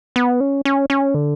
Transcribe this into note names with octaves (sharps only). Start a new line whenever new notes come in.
B3
C#4
C#4
C#4
D3